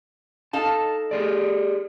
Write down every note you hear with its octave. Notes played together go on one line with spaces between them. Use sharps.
D#4 A4 F5 A5
G4 G#4 D5